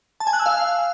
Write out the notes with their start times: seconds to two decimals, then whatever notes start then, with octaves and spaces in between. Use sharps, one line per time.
0.20 A5
0.27 G#5
0.33 F#6
0.39 E6
0.46 F5